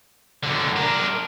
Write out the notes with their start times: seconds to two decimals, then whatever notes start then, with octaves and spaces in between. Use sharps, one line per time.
0.43 F#2 D3
0.76 D4 A#4